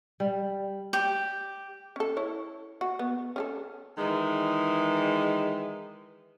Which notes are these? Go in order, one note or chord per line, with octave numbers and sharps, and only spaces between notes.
G3
G4
C#4 A4
E4 C#5
F#4
B3
C#4 G#4 A4
D#3 E3 G#3